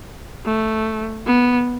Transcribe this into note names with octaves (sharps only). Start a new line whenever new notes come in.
A3
B3